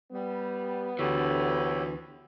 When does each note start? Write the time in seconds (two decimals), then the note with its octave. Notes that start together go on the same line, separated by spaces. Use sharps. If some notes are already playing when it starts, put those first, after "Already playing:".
0.12 G3 B3
0.99 D2 D3 E3 G4 C#5 E6